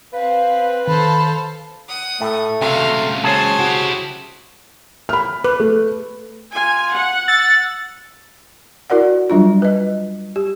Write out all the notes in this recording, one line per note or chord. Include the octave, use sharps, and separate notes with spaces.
C4 B4 F5
D#3 A4 C5 F5 B5
F#5 D#6
A2 A3
C#2 C3 F#4 F5
C#3 G#4 C5 C#5 A5
E4 F#4 G4
B5 F6
B4
A3
F4 G#5
F#5
E6 A6
E4 F#4 A#4 D5 F#5
F#3 G3 D4 F4
B4 D#5
G4